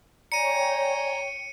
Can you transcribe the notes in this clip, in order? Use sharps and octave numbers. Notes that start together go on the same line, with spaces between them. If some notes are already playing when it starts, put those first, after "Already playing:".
C#5 D5 G5 G#5 A#5 C#7 D#7